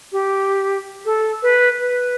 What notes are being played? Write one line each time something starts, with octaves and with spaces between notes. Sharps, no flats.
G4
A4
B4
B4